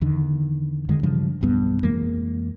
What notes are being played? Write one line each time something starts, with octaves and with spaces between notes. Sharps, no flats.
E2 D3 D#3
F2 D3 D#3 G#3
G2 C#3 E3 F3
E1 B1 G2 B3
F2 E3 G#3 A#3